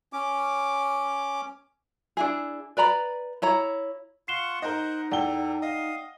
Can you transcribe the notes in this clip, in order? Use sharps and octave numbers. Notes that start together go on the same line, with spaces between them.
C#4 D6
D4 E4 G#4
B4 D5 A#5 B5
E4 C#5 A#5
F4 F#5 C#6 C7 E7 G7
D#4 A#4 C5 D#5 F#5
E2 A4 D5 F#5 G5 G7
D#5 F5 D#6